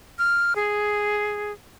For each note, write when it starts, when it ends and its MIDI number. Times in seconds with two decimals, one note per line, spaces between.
0.19 0.54 89
0.56 1.52 68